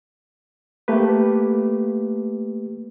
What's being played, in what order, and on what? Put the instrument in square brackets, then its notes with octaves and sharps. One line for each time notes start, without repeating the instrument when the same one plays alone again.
[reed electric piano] A3 A#3 G4 B4